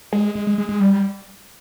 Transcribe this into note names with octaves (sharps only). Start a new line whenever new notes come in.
G#3
G#3
G#3
G#3
G#3
G3